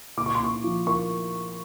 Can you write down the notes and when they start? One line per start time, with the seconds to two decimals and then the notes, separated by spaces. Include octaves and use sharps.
0.17 A#2 D6
0.26 C#6
0.35 C6
0.40 A#2 C#6
0.64 F3
0.87 A#3 C#6